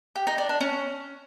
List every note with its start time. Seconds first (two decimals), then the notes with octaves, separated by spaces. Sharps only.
0.16 G4
0.27 D#4
0.38 D4
0.49 D4
0.60 C#4